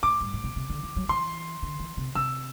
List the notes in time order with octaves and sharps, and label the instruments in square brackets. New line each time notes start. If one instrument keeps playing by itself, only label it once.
[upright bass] A2 [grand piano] D6
[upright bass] G2
A2
B2
C3
D3
E3
F#3
[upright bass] E3 [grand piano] C6
[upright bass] D3
E3
C3
[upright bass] C3 [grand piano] E6